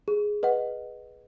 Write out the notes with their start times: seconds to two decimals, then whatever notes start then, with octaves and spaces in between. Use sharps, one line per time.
0.08 G#4
0.43 B4 D#5 F#5